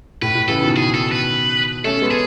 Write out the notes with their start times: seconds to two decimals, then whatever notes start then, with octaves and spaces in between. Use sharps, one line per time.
0.22 A2 B4
0.35 A2
0.48 C#3 E3 A4
0.62 B2 D#3
0.76 G#4
0.94 A4
1.12 B4
1.84 A3 C#4 A4
2.02 G#3 B3
2.11 G#4